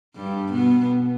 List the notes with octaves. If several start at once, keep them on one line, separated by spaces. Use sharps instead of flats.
G2 G3
B2 B3